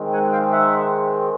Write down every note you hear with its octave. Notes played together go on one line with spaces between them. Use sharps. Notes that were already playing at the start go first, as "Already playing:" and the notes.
Already playing: D#3 G#3 C4
F#5 G#5
F5 G5
E5 F#5